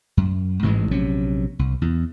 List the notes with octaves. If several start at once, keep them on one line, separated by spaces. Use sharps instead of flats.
F#2
A1 G#2 E3 G#3
A#1 C3 F#3 C#4
C2
E2